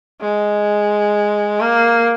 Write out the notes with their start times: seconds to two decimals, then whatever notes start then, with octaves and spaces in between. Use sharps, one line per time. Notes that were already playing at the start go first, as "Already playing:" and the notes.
0.22 G#3
1.61 A#3